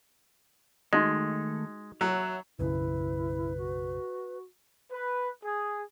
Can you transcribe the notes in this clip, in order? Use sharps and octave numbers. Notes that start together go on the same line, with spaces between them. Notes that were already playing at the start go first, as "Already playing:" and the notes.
D#3 G#3 A3 D#4 F#4 D#5
F#3 C#5 E5 F#5
B1 F#2 C#3 E4 B4
F#4
B4
G#4